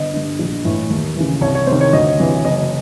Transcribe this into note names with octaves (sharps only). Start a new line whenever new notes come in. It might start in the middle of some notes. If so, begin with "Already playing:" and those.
Already playing: G1 D#5
G2 D3
A#1
A2 E3
D#2
C#3 E3
C2 C#5
C#5
C3 D#3 C5
C#5
D2 D#5
C3 E3
F#1 D#5